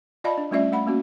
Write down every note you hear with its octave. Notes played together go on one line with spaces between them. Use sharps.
F4 D5 D#5 F5 A5 B5
D4
G3 A3 C#4 F4 D5 E5
A3 F#5 B5
A#3 C#4 F#4